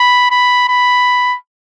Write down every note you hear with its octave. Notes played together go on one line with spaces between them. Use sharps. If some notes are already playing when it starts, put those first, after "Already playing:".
Already playing: B5
B5
B5